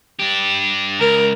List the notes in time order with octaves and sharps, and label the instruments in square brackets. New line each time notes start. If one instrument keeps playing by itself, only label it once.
[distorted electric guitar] D4 G4
[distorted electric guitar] C#2 [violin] A#4